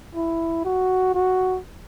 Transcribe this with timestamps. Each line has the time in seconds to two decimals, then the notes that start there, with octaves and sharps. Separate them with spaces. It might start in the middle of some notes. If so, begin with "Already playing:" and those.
0.15 E4
0.65 F#4
1.14 F#4